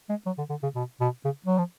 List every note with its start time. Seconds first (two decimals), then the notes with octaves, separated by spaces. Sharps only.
0.10 G#3
0.26 F#3
0.38 D3
0.50 D3
0.63 C#3
0.76 B2
1.01 B2
1.25 C#3
1.46 F#3
1.58 F3